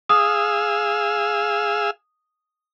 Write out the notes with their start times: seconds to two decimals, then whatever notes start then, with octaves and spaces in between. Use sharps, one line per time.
0.09 G#4 F5 D#6 E6